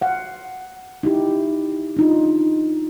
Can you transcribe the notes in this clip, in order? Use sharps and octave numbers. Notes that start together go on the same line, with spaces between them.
F5 F#5
D#4 E4 G4
D4 D#4 F4